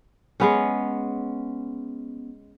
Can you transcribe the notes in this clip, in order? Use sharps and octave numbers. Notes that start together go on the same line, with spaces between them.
G#3 B3 C#4